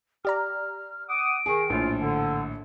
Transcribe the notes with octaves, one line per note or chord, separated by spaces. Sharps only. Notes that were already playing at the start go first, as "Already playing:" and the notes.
G4 D5 A#5 F6
F#5 D6 D#6 D7
D#3 G#4
A#1 A2 C#4 F4
D3 A5